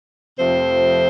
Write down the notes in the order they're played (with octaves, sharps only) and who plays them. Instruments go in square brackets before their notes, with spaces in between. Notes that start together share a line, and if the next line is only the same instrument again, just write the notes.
[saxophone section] F2 C3 F3 A3 C4 C5